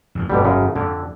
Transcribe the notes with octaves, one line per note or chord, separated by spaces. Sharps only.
F2 C#3 F3
G1 F2 B2 D3 G3
F#2 C#3
F2 D3